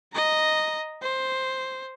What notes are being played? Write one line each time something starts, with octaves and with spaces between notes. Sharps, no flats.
D#5 A#5
C5